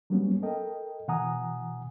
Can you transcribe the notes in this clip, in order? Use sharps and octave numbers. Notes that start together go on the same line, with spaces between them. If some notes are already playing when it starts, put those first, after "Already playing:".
F#3 G3 A#3 B3 C#4
A4 A#4 D#5 G5
B2 E3 F#5 G#5 A#5 D#6